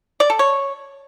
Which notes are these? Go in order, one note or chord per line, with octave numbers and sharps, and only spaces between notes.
D5
A4
C#5